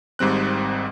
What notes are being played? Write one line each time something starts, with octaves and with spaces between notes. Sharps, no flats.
G#1 G#2 G3 C4 F#6